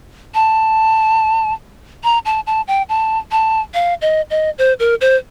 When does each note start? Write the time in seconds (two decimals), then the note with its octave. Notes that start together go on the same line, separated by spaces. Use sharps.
0.35 A5
2.04 A#5
2.25 A5
2.47 A5
2.68 G5
2.89 A5
3.32 A5
3.74 F5
4.02 D#5
4.30 D#5
4.58 C5
4.80 A#4
5.01 C5